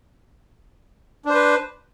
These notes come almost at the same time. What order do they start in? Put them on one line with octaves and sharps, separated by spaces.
D4 C5 B4